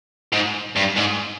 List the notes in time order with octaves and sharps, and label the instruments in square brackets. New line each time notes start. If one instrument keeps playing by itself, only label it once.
[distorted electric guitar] G#2
G2
G#2